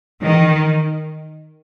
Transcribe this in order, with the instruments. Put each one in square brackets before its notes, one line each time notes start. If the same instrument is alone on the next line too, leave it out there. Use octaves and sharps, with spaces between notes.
[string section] D#3